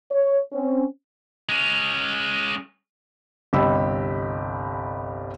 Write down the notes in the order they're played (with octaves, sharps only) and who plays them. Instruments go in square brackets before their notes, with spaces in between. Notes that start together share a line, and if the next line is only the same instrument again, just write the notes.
[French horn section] C#5
C4 C#4
[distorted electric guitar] G#3 C#4
[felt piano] G1 C2 G4 D#5 B5 E6